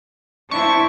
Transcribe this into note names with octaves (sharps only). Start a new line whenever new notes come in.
D4 E4 C5 C#6